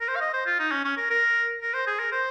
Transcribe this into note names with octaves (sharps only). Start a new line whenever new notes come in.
A#4
C5
F5
D#5
C5
F4
D#4
C#4
C#4
A#4
A#4
A#4
C5
G#4
A#4
C5